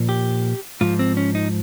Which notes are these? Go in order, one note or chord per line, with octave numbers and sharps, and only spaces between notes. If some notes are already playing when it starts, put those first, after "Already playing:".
Already playing: A#2 F3
G4
G#2 F3 F4
C4
C#4
D#4